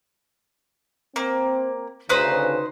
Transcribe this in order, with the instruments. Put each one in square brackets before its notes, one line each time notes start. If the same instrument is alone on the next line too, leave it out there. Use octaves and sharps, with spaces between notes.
[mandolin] A#3 [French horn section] C4
[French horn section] D2 C#3 [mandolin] D#4 B4 C5